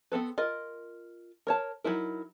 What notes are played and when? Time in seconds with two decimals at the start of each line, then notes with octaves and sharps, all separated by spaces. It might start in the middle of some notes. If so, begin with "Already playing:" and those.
0.12 B3 C4 A4 B4
0.38 F4 A#4 D#5
1.47 A#4 C#5 A5
1.84 F#3 D#4 E4 A#4